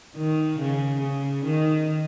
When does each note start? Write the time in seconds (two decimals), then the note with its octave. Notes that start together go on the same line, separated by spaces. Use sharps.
0.17 D#3
0.59 C#3
1.02 C#3
1.46 D#3